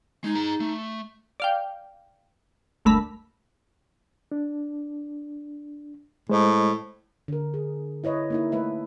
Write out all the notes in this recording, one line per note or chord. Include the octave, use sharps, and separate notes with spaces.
G#3 D#4
G#4 A#5
A3
D5 F5 G5
G1 D2 A3 A#4 B5
D4
A2 G#3 C5 D#5
D3 A#4
G#4
E4 B4 C#5 D#5
A#3 D#4 E4
A3 B4 E5